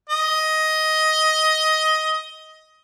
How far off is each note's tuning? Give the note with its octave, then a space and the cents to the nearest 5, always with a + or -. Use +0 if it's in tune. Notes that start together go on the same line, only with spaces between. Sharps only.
D#5 +15